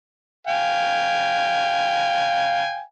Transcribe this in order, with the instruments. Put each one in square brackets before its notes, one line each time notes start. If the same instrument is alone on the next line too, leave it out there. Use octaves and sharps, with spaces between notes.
[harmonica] F5 G5 G#5